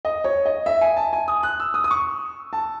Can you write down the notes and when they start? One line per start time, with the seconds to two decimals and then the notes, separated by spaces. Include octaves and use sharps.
0.05 D#5
0.24 C#5
0.46 D#5
0.66 E5
0.81 G#5
0.96 A5
1.13 G#5
1.28 D#6
1.43 F#6
1.60 E6
1.74 D#6
1.84 D#6
1.91 C#6
2.53 A5